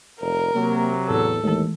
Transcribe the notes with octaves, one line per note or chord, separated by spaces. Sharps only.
F1 A#4
C3 F#3 A#3
E2 A2 G#4 A4 A5
D#2 E3 G#3 A3